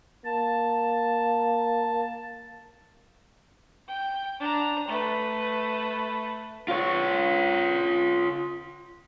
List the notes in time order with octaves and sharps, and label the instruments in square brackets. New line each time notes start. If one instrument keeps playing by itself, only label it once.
[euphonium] A#3 [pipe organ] A5
[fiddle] G5
D4 A#5
A3 B4
[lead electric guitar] F4 C#5